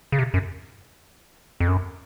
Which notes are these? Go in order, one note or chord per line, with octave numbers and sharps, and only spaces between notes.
C#3
C3
F#2
F2
F#2